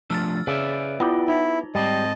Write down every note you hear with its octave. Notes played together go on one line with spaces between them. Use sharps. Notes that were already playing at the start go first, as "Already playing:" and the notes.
F3 A3 D4 E6 F6 A6
C#3 B4 D5 E5
B3 E4 F4 G4
D#4 E4
G#2 G3 C4 D#5 A5